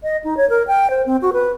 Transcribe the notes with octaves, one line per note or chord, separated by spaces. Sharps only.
D#5
D#4
C#5
A#4
G5
C5
C4
F#4
B4